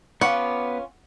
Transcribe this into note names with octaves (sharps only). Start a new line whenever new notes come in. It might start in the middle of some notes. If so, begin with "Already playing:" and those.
B3 C#4 F4 F#5 C#6 D6